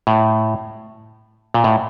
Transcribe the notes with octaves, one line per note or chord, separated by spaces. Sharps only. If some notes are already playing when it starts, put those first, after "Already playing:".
A2
A#2
A2